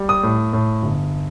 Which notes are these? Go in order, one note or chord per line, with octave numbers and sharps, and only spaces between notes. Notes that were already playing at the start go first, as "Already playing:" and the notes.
Already playing: G3
D#6
A2
A2
G1